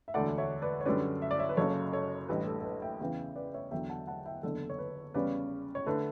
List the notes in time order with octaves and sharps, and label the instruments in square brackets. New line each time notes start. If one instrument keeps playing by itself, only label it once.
[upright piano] E5
E1 D2 D3 A3 D5 F#5
C#5 E5
B4 D5
C#5
F#2 D3 G3 C#4 B4 D5
E5
D5
C#5 E5
B4
F#1 F#2 C#3 A4 C#5
A4 C#5
A1 A2 G3 D4 B4
A4
A4
B4
E5 G5
E2 C#3 E3 E5 G5
B4 D5
C#5 E5
E2 D3 F#3 E5 G5
F#5 A5
F#5 A5
E5 G5
F#1 E2 D3 A4
C#5
B4
E2 C#3 G3 C#4 B4 D5
C#5
D3 A3 B4